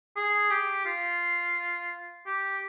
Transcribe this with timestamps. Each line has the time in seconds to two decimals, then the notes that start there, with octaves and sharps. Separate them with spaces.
0.16 G#4
0.51 G4
0.86 F4
2.26 G4